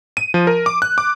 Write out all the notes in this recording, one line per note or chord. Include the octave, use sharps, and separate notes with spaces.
D#7
F3
A#4
D6
F#6
D6